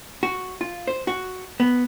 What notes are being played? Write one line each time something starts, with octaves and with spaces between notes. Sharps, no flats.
F#4
F4
C5
F#4
B3